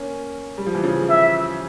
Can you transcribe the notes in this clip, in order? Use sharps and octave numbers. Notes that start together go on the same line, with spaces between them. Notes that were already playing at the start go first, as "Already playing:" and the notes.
Already playing: A#3 C#4
G3
F3
E3
C#3 F3
E5